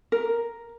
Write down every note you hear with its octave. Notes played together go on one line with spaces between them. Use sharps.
A#4